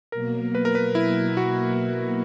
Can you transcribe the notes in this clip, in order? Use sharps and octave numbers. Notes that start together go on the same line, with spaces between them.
B2 F#3 A#3 A#4
B4
A#4
B4
E4
F#4